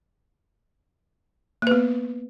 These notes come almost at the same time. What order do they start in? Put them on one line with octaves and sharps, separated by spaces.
A#3 B4 B3